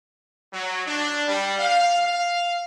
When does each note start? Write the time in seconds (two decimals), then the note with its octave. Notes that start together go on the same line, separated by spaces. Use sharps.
0.52 F#3
0.86 D4
1.28 G3
1.58 F5
2.06 F5